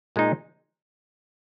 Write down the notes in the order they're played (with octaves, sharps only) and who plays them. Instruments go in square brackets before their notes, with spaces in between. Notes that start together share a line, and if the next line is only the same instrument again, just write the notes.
[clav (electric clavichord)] A#2 G#3 D#4